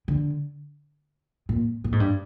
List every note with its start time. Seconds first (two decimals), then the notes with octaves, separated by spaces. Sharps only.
0.08 D3
1.49 A#2
1.84 A#2
1.92 G#2
2.00 G2